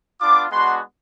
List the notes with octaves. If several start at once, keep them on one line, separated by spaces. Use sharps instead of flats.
B3 D4 F4 D6
G#3 B3 D4 F#4 C6